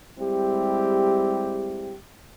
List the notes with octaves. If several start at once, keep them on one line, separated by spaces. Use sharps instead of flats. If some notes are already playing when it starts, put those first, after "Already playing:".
G3 G#3 C4 E4 G4